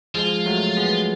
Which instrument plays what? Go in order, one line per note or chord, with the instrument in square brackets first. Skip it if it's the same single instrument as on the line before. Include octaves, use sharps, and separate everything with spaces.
[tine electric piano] F3 G#3 [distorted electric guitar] F4
[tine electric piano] F#3 A3
G#3 B3